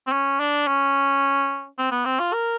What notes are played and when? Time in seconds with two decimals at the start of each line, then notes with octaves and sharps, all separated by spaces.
0.07 C4
0.12 C#4
0.40 D4
0.67 C#4
1.78 C4
1.91 B3
2.05 C4
2.20 F4
2.33 A#4